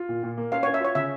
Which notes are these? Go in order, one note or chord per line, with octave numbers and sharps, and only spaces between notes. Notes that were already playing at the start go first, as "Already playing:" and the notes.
Already playing: F4
A#2
A#2
A#3
C#4 F5
C#5
C#4
E5
F4 C#5
C#3 E5